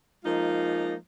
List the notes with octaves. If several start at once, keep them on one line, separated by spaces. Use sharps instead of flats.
F3 G#3 A#3 D#4 F4